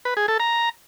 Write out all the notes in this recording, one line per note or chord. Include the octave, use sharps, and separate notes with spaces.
B4
G#4
A4
A#5